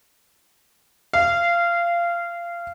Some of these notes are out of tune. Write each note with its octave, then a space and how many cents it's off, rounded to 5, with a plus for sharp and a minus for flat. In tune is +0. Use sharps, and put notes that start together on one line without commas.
F5 -20